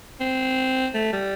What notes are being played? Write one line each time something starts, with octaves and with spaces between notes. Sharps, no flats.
C4
A3
G3